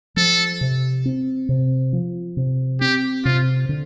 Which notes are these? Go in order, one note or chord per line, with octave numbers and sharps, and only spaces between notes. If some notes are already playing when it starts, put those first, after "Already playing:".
F3 A4
C3
C4
C3
F3
C3
C4 G4
C3 F4
D3